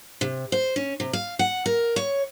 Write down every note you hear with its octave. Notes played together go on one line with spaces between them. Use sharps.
C3
C5
C#4
C3
F5
F#5
A#4
C#5